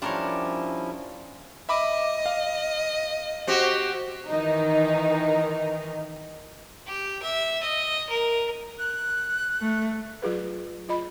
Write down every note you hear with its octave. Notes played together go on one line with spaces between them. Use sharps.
F3 G3 C#4 D4 E4 F4 A#4 C#5
D#5 E5 B5 D6
F5
C4 F#4 G4
D#3 E3 D#4
G4
E5
D#5
A#4
F#6
A3
F#3 F4 G#4 B4
F4 D#5 B5